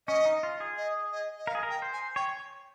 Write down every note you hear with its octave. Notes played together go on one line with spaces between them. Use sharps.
C#4 D#5
D#4
F4
G#4
D#5
D#5
D#5
A#4 F5
G#4
A#4
G5
C5
G#5
C#5 G5